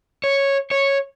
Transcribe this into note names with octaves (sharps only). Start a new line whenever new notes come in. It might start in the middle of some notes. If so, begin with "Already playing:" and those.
C#5
C#5